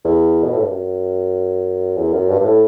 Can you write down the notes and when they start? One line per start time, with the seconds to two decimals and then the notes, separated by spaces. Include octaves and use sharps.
0.05 E2
0.44 B2
0.53 A2
0.61 G2
0.69 F#2
1.97 E2
2.13 F#2
2.29 G2
2.40 G2
2.45 A2